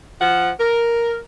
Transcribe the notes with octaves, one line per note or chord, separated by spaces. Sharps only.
F3 F#5
A#4